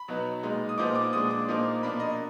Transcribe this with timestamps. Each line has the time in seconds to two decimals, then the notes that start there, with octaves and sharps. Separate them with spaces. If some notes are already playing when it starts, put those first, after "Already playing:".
Already playing: B5
0.08 B2 F#3 B3 D#4
0.43 A#2 G#3 D#4
0.69 D#6
0.78 A#2 F3 B3 D#4 D6
0.95 D6
1.13 A#2 G#3 D4 D#6
1.31 D6
1.48 A#2 F3 A#3 D#4
1.83 B2 A#3 D4 B5
2.00 D#5